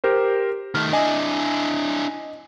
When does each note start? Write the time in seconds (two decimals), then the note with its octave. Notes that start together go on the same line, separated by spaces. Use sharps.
0.04 G4 A#4 C5
0.75 D#3 A3 F6
0.93 D4 E4 D#5 G#5